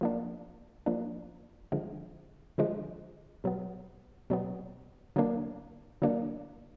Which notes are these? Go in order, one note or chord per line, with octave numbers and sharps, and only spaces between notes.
F3 A#3 D4
F3 A#3 D4
D3 F3 G#3
D3 F3 G#3
B2 F#3 B3
B2 F#3 B3
D3 F#3 A#3 D4
D3 F#3 A#3 D4